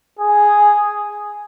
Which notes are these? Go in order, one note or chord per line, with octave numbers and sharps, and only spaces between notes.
G#4